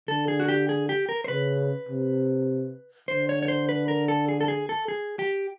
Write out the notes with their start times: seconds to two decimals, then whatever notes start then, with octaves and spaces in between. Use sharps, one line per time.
0.08 D3 A4
0.28 G#4
0.40 F#4
0.48 G4
0.69 G#4
0.89 G4
1.09 A#4
1.24 C5
1.28 C#3 B4
1.89 C3
3.08 D3 C5
3.29 C#5
3.42 C#5
3.48 C5
3.69 B4
3.88 A#4
4.08 A4
4.29 G#4
4.41 A4
4.48 G#4
4.69 A4
4.88 G#4
5.19 G4